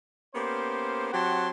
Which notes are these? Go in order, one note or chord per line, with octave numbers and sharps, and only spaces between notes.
A#3 B3 C#4 G4 C5
F#3 C4 G4 F#5 A5 C6